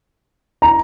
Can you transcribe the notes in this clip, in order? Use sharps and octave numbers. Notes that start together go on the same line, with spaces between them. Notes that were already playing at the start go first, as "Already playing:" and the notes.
A#5